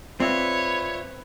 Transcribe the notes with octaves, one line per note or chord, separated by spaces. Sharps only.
C4 F4 B4 C#5 D5 E5